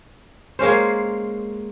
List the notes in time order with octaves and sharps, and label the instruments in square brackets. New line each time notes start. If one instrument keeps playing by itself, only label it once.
[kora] G#3 A#3 C#4 C5